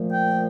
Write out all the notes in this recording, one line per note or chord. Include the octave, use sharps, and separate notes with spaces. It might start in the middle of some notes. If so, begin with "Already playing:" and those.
Already playing: A#2 F3 A3
G5